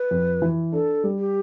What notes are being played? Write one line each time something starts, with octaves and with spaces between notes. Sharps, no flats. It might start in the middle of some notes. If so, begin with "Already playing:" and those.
Already playing: B4
F2
E3
D4 A4
G3
G4